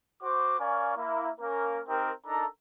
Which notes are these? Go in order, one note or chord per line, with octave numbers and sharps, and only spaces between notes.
F#4 C5 D6
C#4 A#4 D5 F5 G#5 C#6
A#3 E4
A#3 C#4 A#4
C4 D#4 G4 A#4
D4 D#4 A4 A#4 A#5